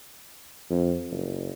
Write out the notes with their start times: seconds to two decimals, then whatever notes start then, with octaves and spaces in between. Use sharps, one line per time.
0.70 F2
1.11 F#1